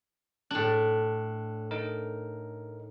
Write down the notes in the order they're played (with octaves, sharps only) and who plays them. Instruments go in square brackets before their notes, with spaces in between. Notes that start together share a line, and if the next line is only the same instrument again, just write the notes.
[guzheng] A2 D4 [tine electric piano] F#6
[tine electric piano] D#4 A#4